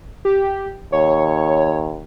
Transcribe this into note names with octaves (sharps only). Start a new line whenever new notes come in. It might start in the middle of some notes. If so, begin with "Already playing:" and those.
G4
D#2 C#5